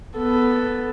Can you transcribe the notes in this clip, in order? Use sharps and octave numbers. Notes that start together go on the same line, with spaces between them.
B3 A4